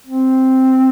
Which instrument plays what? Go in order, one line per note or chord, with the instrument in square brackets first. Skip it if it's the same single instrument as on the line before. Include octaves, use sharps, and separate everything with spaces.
[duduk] C4